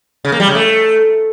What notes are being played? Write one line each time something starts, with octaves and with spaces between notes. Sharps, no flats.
C#3
A#3
G3
C#3
A3